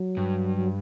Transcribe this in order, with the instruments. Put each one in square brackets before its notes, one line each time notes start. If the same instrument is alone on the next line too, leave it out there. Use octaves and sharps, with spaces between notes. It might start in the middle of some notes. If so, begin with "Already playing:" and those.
Already playing: [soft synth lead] F#3
[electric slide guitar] G2
[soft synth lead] F#3